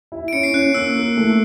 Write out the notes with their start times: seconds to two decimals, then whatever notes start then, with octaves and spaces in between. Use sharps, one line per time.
0.12 E4
0.28 D7
0.33 C#4 C#7
0.43 C7
0.54 C#4 F#6
0.74 A#3 E6
0.96 A#3
1.17 A3